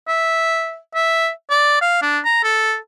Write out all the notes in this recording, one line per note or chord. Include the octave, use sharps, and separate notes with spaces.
E5
E5
D5
F5
D4
A#5
A4